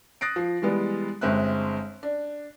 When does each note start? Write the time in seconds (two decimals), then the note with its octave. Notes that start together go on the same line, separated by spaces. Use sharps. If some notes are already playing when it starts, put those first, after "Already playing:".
0.21 D#6 F#6 A6 A#6 C7 D7
0.36 F3
0.62 E3 G3 G#3 B3
1.21 G1 G#3 C4 E5 F#6
2.03 D4